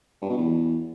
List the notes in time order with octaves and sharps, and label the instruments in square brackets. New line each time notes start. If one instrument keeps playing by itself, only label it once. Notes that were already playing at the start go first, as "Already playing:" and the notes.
[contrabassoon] G2
B2
E2